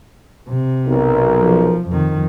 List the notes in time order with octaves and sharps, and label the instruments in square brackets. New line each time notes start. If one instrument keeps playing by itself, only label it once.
[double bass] C3
[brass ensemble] B1 [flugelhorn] A#4
[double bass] F3
F2 D#3